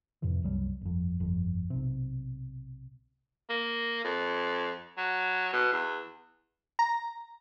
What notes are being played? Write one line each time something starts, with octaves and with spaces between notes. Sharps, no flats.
F2 A2 C3 E3
F#1 C2 F#3 G3
G1 F2
G1 F2
B1 C3
A#3
F2
F#3
B2
E2
A#5